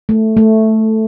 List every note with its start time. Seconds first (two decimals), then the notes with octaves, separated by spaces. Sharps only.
0.09 A3
0.37 A3